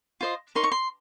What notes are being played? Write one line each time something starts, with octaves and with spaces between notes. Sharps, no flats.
F4 C5 D#5
D#4 A#4 C#5 C6
C#6
C6